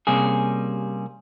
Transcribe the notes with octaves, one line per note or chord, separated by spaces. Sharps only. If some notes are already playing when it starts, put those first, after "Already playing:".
C3 G3 A#3 C#4 G#4